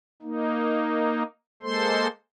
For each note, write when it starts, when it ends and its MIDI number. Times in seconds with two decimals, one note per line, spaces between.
0.22 1.23 58
0.22 1.23 63
1.63 2.07 56
1.63 2.07 58
1.63 2.07 69
1.63 2.07 72
1.63 2.07 84